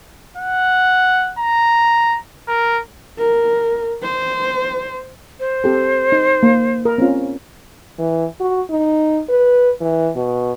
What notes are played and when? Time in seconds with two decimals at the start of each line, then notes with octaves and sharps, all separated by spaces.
0.37 F#5
1.39 A#5
2.48 A#4
3.19 A#4
4.02 C5
5.40 C5
5.64 C4 G4 A4
6.12 D#4
6.43 A#3
6.85 A#4
6.98 C4 C#4 F4
7.99 E3
8.40 F#4
8.70 D#4
9.29 B4
9.81 E3
10.16 B2